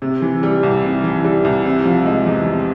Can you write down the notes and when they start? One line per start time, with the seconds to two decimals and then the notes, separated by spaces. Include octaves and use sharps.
0.02 C3
0.22 E3
0.43 G3
0.63 C2
0.84 C3
1.04 E3
1.24 G3
1.45 C2
1.65 C3
1.85 F3
2.06 G#3
2.26 E2
2.47 C3